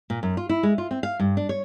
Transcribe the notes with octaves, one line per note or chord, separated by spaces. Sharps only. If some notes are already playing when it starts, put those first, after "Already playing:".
A#2
F#2
F4
E4
G#3
F4
C4
F5
G2
D4
C#5